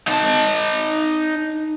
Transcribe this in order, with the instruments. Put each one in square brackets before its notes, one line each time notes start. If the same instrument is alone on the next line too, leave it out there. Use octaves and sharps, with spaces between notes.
[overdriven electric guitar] D#4 A5